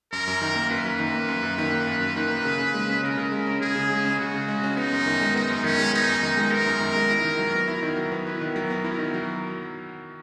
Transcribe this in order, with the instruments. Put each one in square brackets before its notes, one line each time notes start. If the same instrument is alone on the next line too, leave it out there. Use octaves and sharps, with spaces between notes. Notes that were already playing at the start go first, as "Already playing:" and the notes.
[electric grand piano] F#2 [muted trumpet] A#4
[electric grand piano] F#2
D#3
A#3
[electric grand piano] F#2 [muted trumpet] B4
[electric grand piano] F#2
D#3
A#3
F#2
F#2
D#3
A#3
F#2
F#2
D#3
A#3
C#3
C#3
G#3
C#4
[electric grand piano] C#3 [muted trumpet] A#4
[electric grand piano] C#3
G#3
C#4
[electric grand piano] C#3 [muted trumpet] G#4
[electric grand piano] C#3
G#3
C#4
[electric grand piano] C#3 [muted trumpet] F#4
[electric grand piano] C#3
G#3
C#4
[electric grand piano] B3 [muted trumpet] D#4
[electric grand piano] F#2
D#3
G#3
[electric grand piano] B3 [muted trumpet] D#4
[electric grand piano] F#2
[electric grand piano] D#3 [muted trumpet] C#4
[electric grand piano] G#3
[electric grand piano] B3 [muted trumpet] D#4
[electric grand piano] F#2
D#3
G#3
[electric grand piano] B3 [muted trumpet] A#4
[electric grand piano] F#2
D#3
G#3
E4
D#3
F#3
B3
E4
D#3
F#3
B3
[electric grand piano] E4 [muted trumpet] B4
[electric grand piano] D#3
[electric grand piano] F#3 [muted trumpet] A#4
[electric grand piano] B3
[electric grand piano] E4 [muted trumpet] A#4
[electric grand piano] D#3
F#3